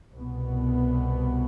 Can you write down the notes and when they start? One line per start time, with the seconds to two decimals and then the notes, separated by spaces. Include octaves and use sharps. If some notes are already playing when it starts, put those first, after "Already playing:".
0.14 C2 B2 B3